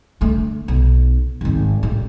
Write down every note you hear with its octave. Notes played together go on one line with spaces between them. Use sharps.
D3 A3
B1
G#1 D#2
A1